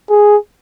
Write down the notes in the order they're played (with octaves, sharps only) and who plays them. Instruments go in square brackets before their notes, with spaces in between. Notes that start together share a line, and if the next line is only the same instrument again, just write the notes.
[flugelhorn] G#4